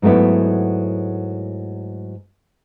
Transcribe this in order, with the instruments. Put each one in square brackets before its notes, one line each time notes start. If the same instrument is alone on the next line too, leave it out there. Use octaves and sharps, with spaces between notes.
[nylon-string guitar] G#2 F#3 A3 B3 E4